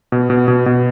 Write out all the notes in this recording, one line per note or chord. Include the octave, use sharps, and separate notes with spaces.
B2
B2
B2
B2